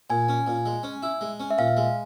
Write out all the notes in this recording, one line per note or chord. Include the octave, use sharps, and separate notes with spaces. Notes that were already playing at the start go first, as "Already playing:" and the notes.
A#2 G#5
C#4
A#2
G#3
C#4
E4
G#3
C#4
E5
A#2 F5
G#3